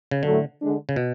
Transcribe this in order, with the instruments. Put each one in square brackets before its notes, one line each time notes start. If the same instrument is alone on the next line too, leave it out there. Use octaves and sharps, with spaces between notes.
[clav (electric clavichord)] C#3
[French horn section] A2 F#3 A3 [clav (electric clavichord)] D3
[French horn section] D3 G#3 D4
[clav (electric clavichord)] C#3
B2